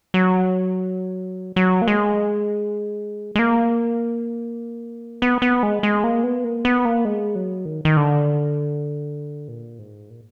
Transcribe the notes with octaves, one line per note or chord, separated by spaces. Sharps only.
F#3
F#3
A#3
G#3
G#3
A#3
B3
B3
G#3
G#3
A#3
B3
A#3
B3
A#3
G#3
F#3
D#3
D#3
D3
A#2
G#2
A#2